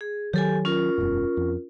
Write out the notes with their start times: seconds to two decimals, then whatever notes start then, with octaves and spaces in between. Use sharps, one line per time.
0.01 G#4
0.33 D#3 F#3 G4 A4 G#5
0.65 C#4 F4 A#4
0.98 E1 F#2
1.37 F2